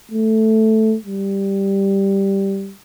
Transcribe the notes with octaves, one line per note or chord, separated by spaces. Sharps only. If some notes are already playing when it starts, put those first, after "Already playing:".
A3
G3